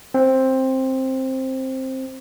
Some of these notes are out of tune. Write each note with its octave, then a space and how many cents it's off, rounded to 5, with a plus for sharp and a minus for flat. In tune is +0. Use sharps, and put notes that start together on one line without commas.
C4 +10